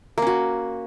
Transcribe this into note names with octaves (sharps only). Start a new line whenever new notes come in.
A#3 C#4 F#4